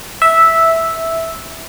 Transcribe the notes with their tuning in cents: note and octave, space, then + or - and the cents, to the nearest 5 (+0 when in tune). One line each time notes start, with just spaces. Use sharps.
E5 -5